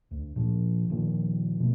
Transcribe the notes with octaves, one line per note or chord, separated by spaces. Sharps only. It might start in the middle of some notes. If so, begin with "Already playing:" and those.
D2
A#2 F3
A#2 D#3 F3 G3
B2 A3